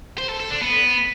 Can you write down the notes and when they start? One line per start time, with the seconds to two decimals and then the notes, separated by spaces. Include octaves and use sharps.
0.18 C5
0.29 A4
0.40 A4
0.50 D4
0.61 B3